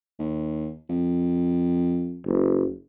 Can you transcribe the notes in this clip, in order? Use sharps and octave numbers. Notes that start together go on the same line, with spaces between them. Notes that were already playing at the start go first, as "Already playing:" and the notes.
D#2
F2
F#1